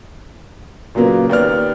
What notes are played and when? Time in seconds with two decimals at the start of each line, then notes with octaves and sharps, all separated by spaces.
0.95 A#2 C#3 F#3 A#3 B3
1.30 D#2 B3 D5 F6